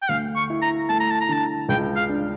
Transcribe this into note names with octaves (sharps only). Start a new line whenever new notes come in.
G5
D2 F5
C#6
E4
A#5
A3 A5
A#5
A5
A#5
D3 A5
C#2 G5
F5
D4